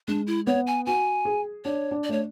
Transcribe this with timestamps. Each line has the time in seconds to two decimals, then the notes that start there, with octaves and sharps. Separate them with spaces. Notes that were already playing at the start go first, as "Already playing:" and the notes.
0.08 G#3 D4
0.27 E4
0.47 B3 C#5
0.67 G#5
0.86 F#4 G#5
1.25 G#4
1.65 D4 C#5
1.91 D4
2.04 D5
2.09 A3 C#5